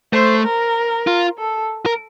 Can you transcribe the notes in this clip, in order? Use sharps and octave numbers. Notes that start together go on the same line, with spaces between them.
A3 C5
A#4
F4
A4
A#4